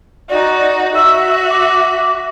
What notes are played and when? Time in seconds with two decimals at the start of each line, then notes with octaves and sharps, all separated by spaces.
0.29 D#4 F#4 D5
0.95 F#4 E5 E6
1.50 D6